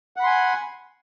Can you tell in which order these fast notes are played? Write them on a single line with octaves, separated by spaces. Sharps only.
F#5 B5 C6 G#5